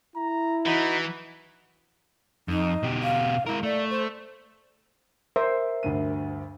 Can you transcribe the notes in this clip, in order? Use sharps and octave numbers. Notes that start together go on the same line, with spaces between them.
E4 A#5
E3 D#4 F#4 B5
F2 D#4
B2 G4
F5
G#3 E4 A#4
A3 D5
C5
A#4 C5 E5
D2 G2 D#7